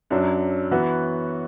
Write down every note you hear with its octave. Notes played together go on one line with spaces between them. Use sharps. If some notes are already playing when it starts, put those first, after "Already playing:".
F#2 F#3 D4
E3 B3 F#4